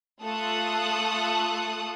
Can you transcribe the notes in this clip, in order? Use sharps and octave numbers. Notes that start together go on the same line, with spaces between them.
A3 F4 A4 D#6 F#6